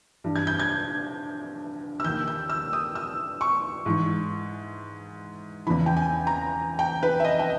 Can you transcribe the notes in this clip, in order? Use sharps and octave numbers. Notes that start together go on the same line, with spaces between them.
G2 E3
G#6
G6
G#6
E6
D#2 D#3 G6
G6
E6
D#6
E6
C#6
G#2 E3
E2 C#3 E3 B5
G5
G#5
A#5
G5
B4
E5
D#5
G5